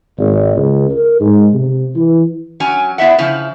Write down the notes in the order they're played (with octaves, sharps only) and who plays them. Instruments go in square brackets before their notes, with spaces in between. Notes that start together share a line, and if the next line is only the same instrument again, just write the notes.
[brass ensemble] G#1
C#2
A#4
G#2
C3
E3
[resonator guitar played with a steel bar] F#3 C#4 G#5
B3 E4 E5 F#5
C#3 F3 E4